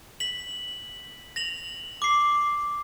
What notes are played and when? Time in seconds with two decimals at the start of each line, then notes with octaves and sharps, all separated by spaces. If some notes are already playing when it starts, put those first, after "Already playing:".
0.20 B6 F#7
1.36 A#6 F7 F#7
2.02 D6 C7